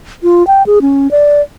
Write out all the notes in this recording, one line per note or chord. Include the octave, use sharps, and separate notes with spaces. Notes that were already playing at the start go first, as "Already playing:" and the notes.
F4
G5
G#4
C#4
D5